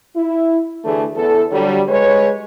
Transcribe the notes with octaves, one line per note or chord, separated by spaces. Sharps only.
E4
D2 E3 A3 D4 G#4
E2 A4
D3 F#3 G3
G#3 B4 C#5